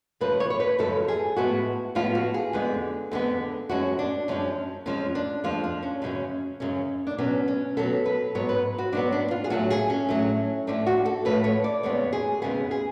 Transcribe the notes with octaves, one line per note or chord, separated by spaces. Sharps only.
F#2 C#3 F3 G#3 B4
C#5
C#5
B4
F#2 C#3 F3 G#3 A4
G#4
A2 F3 G#3 B3 F#4
A2 F3 G#3 B3 F4
F#4
G#4
F2 D3 G#3 B3
F2 D3 G#3 B3
F#2 F3 G#3 C#4 F#4
D4
F#2 F3 G#3 C#4
F2 F3 G#3 C#4
D4
F2 F3 G#3 F4
D4
C#4
F#2 C#3 G#3 C#4
F#2 C#3 G#3 C#4
D4
B2 F#3 B3 C#4
C#4
B2 F#3 B3 A4
B4
G#2 F#3 B3 C#5
B4
F#4
G#2 F#3 B3 D4
D4
F4
G#4
A2 F#3 A3 F#4
G#4
C#4
A2 F#3 A3
A2 F3 A3 D4
F#4
A4
A2 F3 A3 B4
C#5
D5
F2 C#3 G#3 B3 C#5
G#4
F2 C#3 G#3 B3 G#4
G#4